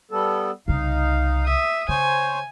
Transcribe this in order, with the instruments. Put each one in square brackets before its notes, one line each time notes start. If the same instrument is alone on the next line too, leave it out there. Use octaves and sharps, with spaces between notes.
[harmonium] G3 B3 A4
[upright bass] C2 C#3 [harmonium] D#4 F5
[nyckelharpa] E5 D#6
[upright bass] C#3 [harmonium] C5 C#5 [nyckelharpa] G#5